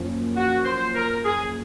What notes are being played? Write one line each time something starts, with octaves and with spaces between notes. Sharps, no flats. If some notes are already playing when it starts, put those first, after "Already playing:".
Already playing: F#2 F3 A#3 C#4
F#4
C5
A#4
G#4